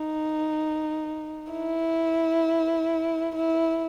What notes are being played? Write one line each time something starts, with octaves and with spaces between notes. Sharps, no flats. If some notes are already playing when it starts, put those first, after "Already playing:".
Already playing: D#4
E4
E4